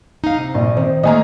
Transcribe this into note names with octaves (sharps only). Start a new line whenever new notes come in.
D#4 F5
C3
A#1
D#3 C4
D#3 A3 A#3 D#5 G#5 A#5